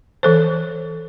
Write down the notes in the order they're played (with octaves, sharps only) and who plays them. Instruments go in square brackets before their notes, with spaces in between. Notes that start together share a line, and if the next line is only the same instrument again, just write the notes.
[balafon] E3 A4 C5